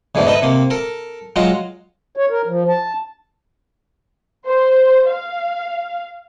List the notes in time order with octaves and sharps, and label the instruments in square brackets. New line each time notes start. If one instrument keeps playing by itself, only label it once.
[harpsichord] E2 G#2 D3 E3 A3
D#4 A4 B4 D#5 E5
C3 A#3
A4 A#4
F#3 G#3 F4 F#4 A#5
[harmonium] C#5
A#4
F3
A5
[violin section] C5
F5